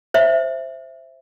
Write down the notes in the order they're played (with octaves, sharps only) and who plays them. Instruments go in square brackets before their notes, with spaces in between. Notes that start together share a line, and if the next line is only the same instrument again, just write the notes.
[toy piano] C5 E5